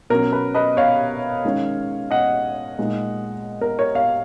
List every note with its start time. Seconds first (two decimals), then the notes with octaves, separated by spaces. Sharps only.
0.10 B2 F#3 C#4 A#4
0.33 B4
0.55 B4 D#5
0.77 C#5 F5
1.44 D#3 G#3 C#4
2.11 D#5 F#5
2.78 A#2 G#3 D#4
3.61 A#4
3.79 A#4 C#5
3.95 C#5 F5